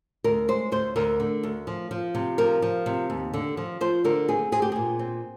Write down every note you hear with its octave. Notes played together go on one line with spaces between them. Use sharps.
D2 A#4
G#3 C5
D2 C5
D2 A#4
D3
D2
F3
F3
C3
F3 A#4
F3
C3
D#2
D3
F3
F3 C5
D3 A#4
C4 G#4
C4 G#4
G4
A#2 G#4
C4